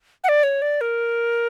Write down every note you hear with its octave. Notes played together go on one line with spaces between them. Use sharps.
F#5
D5
C#5
D5
A#4